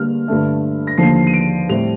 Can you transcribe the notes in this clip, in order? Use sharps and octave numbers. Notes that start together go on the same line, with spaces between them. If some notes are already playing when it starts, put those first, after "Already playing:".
Already playing: D3 G3 A#3 F6
G2 D3 A3
A#6
D#2 D3 F3 C7
D#7
D7
A2 G3 C4 F7